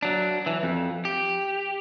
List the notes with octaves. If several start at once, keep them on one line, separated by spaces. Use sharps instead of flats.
F#3 D4
E3
F2
G4